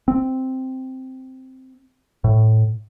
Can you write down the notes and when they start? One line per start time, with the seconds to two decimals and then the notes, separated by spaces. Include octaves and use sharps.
0.08 C4
2.24 A2